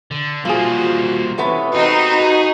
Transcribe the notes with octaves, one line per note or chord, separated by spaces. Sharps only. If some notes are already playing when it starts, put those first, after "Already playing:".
D3
F3 G3 A#3 F4 F#4 G#4 C5
C3 E3 A3 B3 C#4
C4 D#4 F#4 B5
G#4